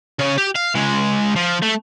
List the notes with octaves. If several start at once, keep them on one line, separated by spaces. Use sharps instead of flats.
C#3 C#4
G4
F5
C#2 G#3
F3
A3